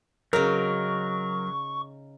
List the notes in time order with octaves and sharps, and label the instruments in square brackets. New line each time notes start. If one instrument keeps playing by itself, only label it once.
[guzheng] C#3 D#4 [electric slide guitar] F#3 [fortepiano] A#4 [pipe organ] C#6